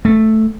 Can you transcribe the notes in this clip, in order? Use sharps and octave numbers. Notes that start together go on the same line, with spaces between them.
A3